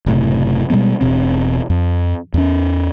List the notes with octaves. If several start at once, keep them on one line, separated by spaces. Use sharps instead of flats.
F#1 A2 C3
B2 G3 G#3 B3
E1 B2 C4
F2
E2 C#4